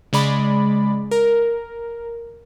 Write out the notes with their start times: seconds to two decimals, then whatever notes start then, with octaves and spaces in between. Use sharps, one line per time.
0.13 C#3 G#3 D5 B5
1.11 A#4